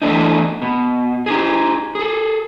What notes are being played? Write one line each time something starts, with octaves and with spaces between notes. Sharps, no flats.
E2 G2 A3 B3 D4 D#4
B2
D#4 G4 G#4
G#4 A4